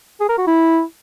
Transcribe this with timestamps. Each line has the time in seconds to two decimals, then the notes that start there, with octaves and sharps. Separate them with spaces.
0.20 G#4
0.29 A#4
0.38 F#4
0.47 E4